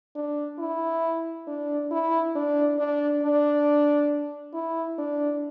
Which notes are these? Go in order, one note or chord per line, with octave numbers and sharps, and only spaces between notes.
D4
E4
D4
E4
D4
D4
D4
E4
D4